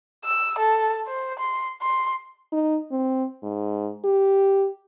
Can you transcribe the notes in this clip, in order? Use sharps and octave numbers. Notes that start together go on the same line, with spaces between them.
E6
A4
C5
C6
C6
D#4
C4
G#2
G4